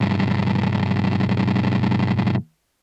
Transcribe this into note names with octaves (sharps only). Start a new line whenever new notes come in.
B1 G2